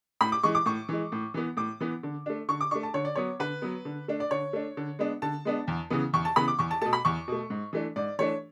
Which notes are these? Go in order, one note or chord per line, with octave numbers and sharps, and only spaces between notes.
A2 B5
D6
E3 G#3 C#6
D6
A2 C#6
E3 G#3
A2
E3 B3
A2 D6
E3 B3
D3
A3 D4
D3 C#6
D6
A3 D4 C#6
A5
D3 C#5
D5
F#3 B3 C#5
D3 B4
F#3 B3
D3
A3 D4
D5
D3 C#5
A3 D4
D3
G#3 B3 D4
D3 A5
G#3 B3 D4
E2
C#3 E3 B3
E2 C#6
A5
C#3 E3 B3 B5
D6
E2 C#6
A5
B2 A3 A5
B5
E2 C#6
B2 A3
G#2
E3 A3 D4
G#2 D5
E3 A3 D4 C#5